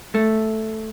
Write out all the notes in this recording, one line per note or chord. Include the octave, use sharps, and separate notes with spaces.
A3